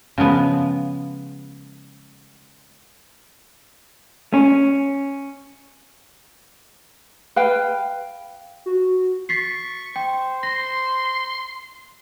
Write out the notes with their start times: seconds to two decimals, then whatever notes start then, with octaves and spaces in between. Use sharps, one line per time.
0.18 C#3 F3 G#3 B3
4.34 C#4
7.36 B4 F5 G5
8.66 F#4
9.29 C#6 A6 B6 C7
9.96 C5 G5
10.43 C6 A#6